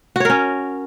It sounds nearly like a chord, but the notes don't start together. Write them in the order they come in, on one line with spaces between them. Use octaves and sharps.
F#4 C#5 A#4 C#4